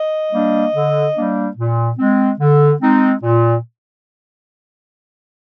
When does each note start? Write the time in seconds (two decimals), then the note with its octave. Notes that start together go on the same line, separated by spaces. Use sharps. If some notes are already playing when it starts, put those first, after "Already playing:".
Already playing: D#5
0.32 G3 A#3 D4
0.74 D3
1.15 G3 A#3 D4
1.57 A#2
1.97 G#3 C4
2.39 D3
2.81 G#3 C4 D#4
3.23 A#2